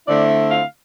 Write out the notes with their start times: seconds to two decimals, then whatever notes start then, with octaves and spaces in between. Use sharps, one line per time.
0.08 D3 A3 C4 E4 D5
0.30 E5
0.51 F5